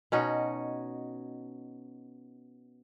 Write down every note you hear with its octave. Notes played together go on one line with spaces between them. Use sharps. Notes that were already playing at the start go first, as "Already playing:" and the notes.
B2 C#4 D#4 F#4